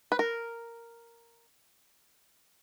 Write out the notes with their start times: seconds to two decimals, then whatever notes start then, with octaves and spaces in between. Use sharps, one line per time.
0.12 B4
0.19 A#4